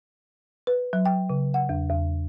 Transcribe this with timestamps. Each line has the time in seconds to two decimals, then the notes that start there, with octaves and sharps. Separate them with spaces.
0.67 B4
0.93 F#3
1.06 G5
1.30 C#3
1.54 F#5
1.69 E2
1.90 E2